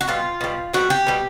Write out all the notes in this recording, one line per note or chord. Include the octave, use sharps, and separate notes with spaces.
F#4
B2 G3 F4
B2 G3
B2 G3 F#4
G4
B2 G3